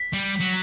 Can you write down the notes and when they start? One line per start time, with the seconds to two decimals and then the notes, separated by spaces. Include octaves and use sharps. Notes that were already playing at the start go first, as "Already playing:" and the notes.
Already playing: B6
0.13 G3
0.40 F#3